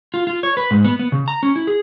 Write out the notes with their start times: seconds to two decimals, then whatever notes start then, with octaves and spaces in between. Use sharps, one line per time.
0.14 F4
0.27 F4
0.43 C#5
0.57 B4
0.71 G#2
0.84 B3
0.99 B3
1.12 C#3
1.28 A#5
1.43 C#4
1.56 E4
1.67 G#4